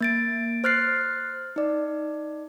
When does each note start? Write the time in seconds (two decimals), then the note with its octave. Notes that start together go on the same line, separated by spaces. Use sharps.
0.01 A#3 A6 D7
0.64 C5 F6 F#6 A6 C7
1.56 D#4 D5